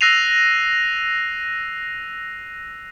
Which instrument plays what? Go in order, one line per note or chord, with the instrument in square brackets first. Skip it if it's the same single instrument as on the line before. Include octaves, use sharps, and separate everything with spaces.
[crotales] E6 F#6 A#6 C7 D#7 F7